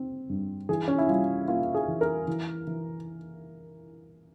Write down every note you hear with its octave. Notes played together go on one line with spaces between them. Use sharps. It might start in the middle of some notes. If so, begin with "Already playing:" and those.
Already playing: C4
G2
E3 G#4
C#4
E4
G3 F4
A#3 F4
G#4
E3
A#4
E3
E3